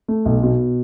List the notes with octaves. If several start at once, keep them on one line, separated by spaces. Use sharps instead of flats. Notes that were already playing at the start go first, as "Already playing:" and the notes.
A3
B1
B2